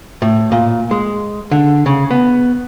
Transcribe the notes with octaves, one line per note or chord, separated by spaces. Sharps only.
A2
A#2
G#3
D3
C#3
B3